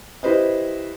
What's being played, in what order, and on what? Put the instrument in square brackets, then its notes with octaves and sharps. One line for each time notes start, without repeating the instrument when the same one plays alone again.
[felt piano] E4 G4 B4 C5 D#5